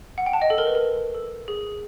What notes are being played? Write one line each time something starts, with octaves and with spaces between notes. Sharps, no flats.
F#5
G5
A5
D#5
A4
A#4
B4
A#4
A4
G#4